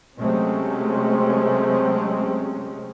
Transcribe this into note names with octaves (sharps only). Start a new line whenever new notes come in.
C3 F#3 G#3 A3 C4 C#4